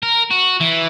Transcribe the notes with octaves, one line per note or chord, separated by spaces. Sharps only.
A#4
F#4
E3